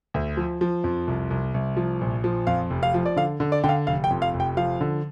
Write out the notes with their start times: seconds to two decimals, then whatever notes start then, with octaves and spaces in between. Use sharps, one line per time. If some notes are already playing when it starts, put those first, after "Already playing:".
0.14 D2
0.37 F3
0.61 F3
0.84 F2
1.07 C2
1.30 C2
1.54 C2
1.77 F3
2.01 A#1
2.24 F3
2.47 F2 F5
2.70 F1
2.83 F5
2.94 F3
3.06 D5
3.16 D3 F5
3.40 D3
3.52 D5
3.64 D3 G5
3.69 F5
3.87 F1 F5
4.04 G5
4.11 F2
4.22 F5
4.34 F1
4.40 G5
4.57 F3 F5
4.81 D3